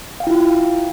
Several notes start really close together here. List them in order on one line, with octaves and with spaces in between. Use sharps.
F5 G5 E4 F4